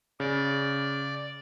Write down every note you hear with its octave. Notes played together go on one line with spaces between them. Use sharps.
C#3 D5